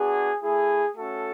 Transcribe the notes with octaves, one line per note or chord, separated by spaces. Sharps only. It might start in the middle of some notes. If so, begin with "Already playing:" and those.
Already playing: B3 D4 F#4 G#4
A3 E4 G#4
A3 C#4 F#4 A4